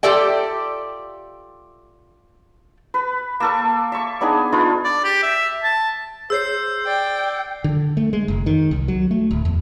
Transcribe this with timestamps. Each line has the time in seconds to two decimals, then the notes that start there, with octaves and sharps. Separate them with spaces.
0.03 F4 G4 A4 D5 E5 G5
2.94 B4
3.40 A#3 A4 C#6
3.92 E5 C#6
4.21 B3 D4 D#4 G#4
4.52 D4 D#4 F4 B4
4.84 D5
5.04 G4
5.23 E5
5.64 A5
6.30 G#4 C5 C#5 E6 G6 C7
6.87 D5 G5
7.64 D3
7.97 A3
8.13 G#3
8.28 F1
8.46 D#3
8.71 C2
8.88 F#3
9.11 A3
9.31 D1
9.45 E2